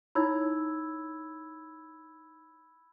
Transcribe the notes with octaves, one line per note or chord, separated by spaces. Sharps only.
D#4 E4 C#5 B5 E6 G#6